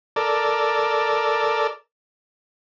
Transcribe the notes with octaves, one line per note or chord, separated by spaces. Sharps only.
A4 A#4 D5